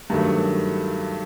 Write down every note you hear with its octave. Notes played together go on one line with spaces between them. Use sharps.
G2 D#3 F#3 A3